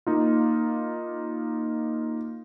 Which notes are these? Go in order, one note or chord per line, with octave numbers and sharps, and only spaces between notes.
A#3 D#4 F4